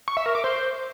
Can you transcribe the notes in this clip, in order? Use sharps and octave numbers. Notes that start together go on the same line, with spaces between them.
C#6
E5
A#4
D6
C5